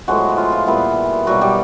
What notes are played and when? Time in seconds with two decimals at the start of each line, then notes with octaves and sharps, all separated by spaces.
0.08 A2 F3 F#3 G#3 B3 F#4
0.38 F4
0.52 F4
0.67 A#2 G3 B3 E4
1.27 B2 F#3 G3 B3 F#4
1.41 G3 G4